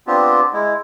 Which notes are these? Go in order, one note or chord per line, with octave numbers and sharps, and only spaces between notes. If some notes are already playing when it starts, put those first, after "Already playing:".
B3 C4 D4 F4 G4
G#3 E4